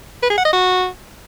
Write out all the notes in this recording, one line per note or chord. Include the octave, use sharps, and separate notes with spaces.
B4
G#4
F#5
D#5
F#4